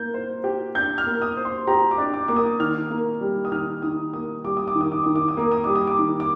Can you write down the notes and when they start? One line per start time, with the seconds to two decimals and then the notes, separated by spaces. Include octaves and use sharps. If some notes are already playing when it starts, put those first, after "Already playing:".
Already playing: A#3 G6
0.14 C5
0.44 G4
0.75 D4 G6
0.98 F6
1.07 A#3
1.22 D#6
1.37 C5
1.45 C6
1.67 G4 A#5
1.91 D6
1.98 D4
2.14 D6
2.28 A#3 D6
2.36 D#6
2.60 D#3 F6
2.90 A#3
3.21 G3
3.45 D#6
3.52 D#3 F6
3.82 D#3 D#6
4.13 A#3 D#6
4.45 G3 D6
4.57 D#6
4.68 D6
4.75 D#3
4.81 D#6
4.92 D6
5.04 D#3 D#6
5.15 D6
5.28 D#6
5.37 A#3 D6
5.52 D#6
5.64 G3 D6
5.75 D#6
5.87 D6
5.99 D#3
6.20 D6